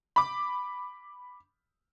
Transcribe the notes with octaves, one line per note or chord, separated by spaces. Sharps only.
B5 D6